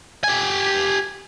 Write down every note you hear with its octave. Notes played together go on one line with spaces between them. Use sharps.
G4 G#5